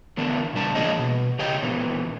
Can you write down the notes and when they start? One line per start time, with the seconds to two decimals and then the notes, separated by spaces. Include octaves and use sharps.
0.17 D3 E3 B3 D4 A#4
0.53 A#2 C#3 G3 D4 A5
0.75 E3 A#3 D4 G#4 C#5 D#5
0.99 B2
1.39 C#3 G4 C#5 D#5 G5
1.62 A#2 E3 B3